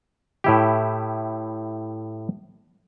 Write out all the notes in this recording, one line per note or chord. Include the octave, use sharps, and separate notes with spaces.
A2 E4 G4